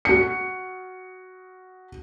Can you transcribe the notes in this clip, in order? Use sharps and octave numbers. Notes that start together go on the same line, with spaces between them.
F#4 C#7